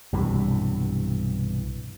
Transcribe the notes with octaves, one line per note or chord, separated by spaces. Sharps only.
B1 G2 C3 E3